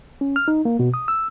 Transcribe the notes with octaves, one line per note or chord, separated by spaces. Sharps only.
C#4
F6
D#4
A#3
B2
D#6
E6